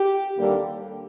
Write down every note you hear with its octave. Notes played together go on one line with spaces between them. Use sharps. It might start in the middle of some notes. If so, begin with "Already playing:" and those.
Already playing: G4
D#2 D3 G3 A#3